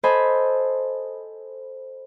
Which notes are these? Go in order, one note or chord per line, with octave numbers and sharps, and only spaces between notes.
A4 C5 D#5 G#5 B5